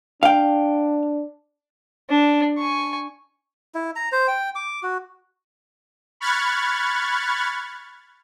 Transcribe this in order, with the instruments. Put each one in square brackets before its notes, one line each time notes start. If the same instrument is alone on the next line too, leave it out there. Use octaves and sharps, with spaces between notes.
[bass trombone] D4 [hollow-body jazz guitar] F5 G5
[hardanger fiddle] D4
G#5 C#6
[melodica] E4
A#5
C5
G5
D6
F#4
[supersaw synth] B5 C#6 F6 F#6 G#6 A6